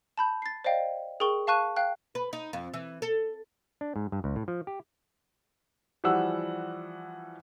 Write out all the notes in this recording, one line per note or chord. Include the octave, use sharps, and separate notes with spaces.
A5 B5 G6
A6 C7
C5 D5 D#5 F5 G5
G#4 A#4 G5 C#6 G7
F5 A5 C#6 F#6 D#7
F5 G5 F#6
B4
D#4
F2
E3
A4
D4
G#2
G2
C#2
A2
F3
G4
E3 F3 G3 F#4 F#5 E6